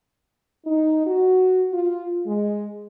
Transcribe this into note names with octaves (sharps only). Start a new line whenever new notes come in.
D#4
F#4
F4
G#3